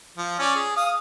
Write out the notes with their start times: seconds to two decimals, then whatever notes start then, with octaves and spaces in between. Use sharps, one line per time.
0.17 F3
0.39 C#4 C#5 D5
0.55 G#4
0.77 F5 D#6